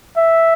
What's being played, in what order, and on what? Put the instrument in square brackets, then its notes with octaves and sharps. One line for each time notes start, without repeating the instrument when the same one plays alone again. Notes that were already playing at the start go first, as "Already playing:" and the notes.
[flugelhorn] E5